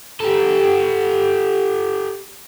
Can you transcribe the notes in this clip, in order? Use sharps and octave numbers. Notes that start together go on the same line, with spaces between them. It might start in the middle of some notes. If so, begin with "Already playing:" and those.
G4 A4